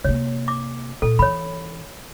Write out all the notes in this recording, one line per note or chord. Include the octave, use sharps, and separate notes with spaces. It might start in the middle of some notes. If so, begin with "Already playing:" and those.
C3 A#3 C#5
D6
A#2 A4
E3 C#5 B5